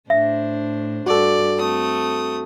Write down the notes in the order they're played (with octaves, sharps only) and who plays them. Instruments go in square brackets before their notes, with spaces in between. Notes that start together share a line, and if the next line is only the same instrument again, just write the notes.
[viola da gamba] A2 D4 C5 [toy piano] E5
[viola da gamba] G2 [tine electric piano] F#4 A4 [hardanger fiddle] D5
[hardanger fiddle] A3 D#6 [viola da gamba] C4